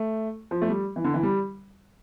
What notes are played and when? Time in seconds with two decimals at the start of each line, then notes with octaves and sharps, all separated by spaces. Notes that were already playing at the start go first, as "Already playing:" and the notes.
Already playing: A3
0.51 F3
0.62 A3
0.69 G3
0.96 E3
1.04 D3
1.14 E3
1.23 G3